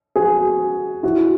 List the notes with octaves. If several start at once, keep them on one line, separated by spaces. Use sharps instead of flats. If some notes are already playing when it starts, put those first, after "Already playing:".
F#4 G#4
E4 F#4